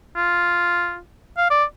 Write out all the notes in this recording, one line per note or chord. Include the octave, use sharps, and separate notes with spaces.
F4
F5
D5